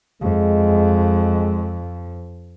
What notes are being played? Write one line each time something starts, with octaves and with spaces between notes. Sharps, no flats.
F2 G#3